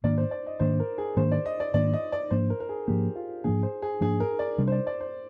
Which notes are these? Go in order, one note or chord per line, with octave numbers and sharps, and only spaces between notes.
G#2 D#3 A#3 D4 D5
C5
D5
D#5
G#2 D#3 A#3 D4 C5
A#4
G#4
G#2 D#3 A#3 D4 C5
D5
D#5
D5
G#2 D#3 A#3 D4 D5
D#5
D5
G#2 F3 A#3 D4 C5
A#4
A#4
G#4
G#2 F3 A#3 D4 G4
F4
G#2 F3 A#3 D4 G#4
C5
G#4
G#2 F3 A#3 D4 G#4
A#4
D5
C3 G3 D4
C5
D5
D5
C5